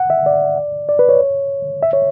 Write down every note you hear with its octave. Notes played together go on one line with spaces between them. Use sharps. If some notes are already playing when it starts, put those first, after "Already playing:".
Already playing: F#5
E5
D5
D5
B4
C#5
E5
C#5